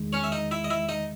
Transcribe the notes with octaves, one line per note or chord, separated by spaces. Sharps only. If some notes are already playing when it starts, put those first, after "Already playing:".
Already playing: E2 D#3 G#3
C#4 C#5
E5
D#4 D#5
E4 E5
D#5
E4 E5
D#4 D#5